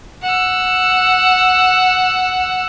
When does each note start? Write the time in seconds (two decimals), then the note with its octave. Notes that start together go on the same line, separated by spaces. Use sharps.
0.23 F#5 E6